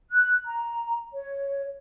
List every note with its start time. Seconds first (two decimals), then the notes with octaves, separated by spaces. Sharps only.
0.11 F#6
0.45 A#5
1.14 C#5